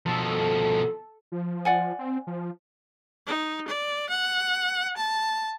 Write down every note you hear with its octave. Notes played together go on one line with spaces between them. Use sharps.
B2 F3 A4
F3
D5 F#5 G#5
C4
F3
D#4
D5
F#5
A5